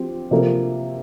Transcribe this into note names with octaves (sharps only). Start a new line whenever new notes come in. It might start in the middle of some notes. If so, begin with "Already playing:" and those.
Already playing: F3 C4 G4
C3 F3 A#3